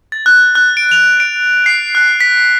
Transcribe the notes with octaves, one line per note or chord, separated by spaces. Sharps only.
A6
F#6
F#6
D7
F7
D7
C7
F#6
B6